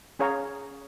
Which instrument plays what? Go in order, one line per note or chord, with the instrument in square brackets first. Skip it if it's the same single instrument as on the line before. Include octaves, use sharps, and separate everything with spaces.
[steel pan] C#4 G#4 C#5 F5 A#5